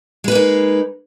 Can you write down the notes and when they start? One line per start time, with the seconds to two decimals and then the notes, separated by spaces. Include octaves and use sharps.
0.24 G#3
0.28 B4
0.32 A#3
0.35 D#4